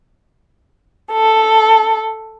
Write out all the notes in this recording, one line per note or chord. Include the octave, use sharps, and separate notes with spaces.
A4